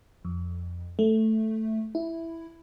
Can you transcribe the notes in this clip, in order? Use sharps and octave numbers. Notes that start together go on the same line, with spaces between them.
F2
A3
E4